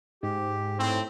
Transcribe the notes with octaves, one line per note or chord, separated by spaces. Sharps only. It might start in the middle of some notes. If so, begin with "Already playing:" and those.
G#2 G4
A2 C4